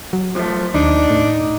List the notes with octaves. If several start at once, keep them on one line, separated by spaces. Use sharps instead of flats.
F#3
F3 A3
D#2 D4 D#4
A2